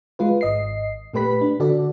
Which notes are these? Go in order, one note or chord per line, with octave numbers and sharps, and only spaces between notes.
G#3 F4 B4
G#1 D#5 C7
A#2 A3 G4 B4 B5 B6
D4
D3 F#4 A4 D5